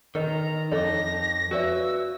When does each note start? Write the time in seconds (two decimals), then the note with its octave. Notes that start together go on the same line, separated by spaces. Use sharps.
0.15 D#3 A#4 B4 D#5 A#5
0.72 F2 D#4 A4 C#5 D6 A#6
1.51 F#4 B4 C#5 D5 E5 F5 E6